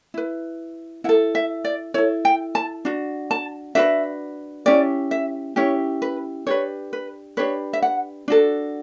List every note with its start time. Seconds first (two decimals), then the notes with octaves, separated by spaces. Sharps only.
0.14 E4 B4
1.04 E4 F#5
1.09 A4
1.35 E5
1.65 D5
1.94 E4 A4 C#5
2.25 G5
2.55 A5
2.85 D4 F#4
3.31 A5
3.75 D4 F#4 B4 E5
4.66 C#4 E4 G4 D5
5.11 E5
5.56 C#4 E4 G4 C#5
6.02 B4
6.47 D4 G4 B4 C#5
6.93 B4
7.37 D4 G4 B4 C#5
7.73 E5
7.82 F#5
8.28 D4 F#4 A4